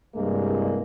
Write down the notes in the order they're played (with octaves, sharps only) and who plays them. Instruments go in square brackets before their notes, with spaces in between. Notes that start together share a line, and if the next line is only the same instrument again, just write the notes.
[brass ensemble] C2 G2 G#3 A#3